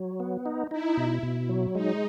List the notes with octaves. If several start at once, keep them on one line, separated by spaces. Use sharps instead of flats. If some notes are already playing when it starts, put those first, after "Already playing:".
Already playing: F#3
B3
D#4
D#4 E4
B2
B2
F#3
G#3 D#4